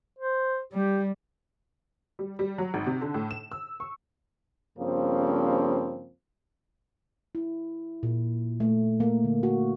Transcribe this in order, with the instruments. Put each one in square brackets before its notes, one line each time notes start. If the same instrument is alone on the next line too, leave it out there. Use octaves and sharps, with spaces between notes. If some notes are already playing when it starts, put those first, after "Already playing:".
[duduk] C5
[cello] G3 [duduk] G4
[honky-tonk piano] G3
G3
F#3
G#1
C3
D3
A2
E7
E6
C#6
[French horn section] G2 C#3 F3 A#3 C4
[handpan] E4
A#2
A3
A#3
D3
F#4